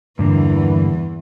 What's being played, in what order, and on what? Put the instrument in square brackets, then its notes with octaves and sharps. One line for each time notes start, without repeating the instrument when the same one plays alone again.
[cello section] E2 E3 [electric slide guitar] G2 D3 A#3